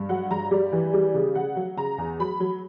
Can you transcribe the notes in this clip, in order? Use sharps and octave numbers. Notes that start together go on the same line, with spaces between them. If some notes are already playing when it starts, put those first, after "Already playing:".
Already playing: G2
F#3 F#5
G2 A#5
G3 D5
E3
G3 D5
C#3
C#3 F#5
F#3
C#3 A#5
E2
F#3 B5
F#3